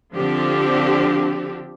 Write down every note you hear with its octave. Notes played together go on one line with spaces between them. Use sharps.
D3 F3 C4 G4